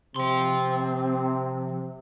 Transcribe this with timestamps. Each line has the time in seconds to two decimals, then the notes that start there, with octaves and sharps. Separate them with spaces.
0.16 C3 F3 C4 C6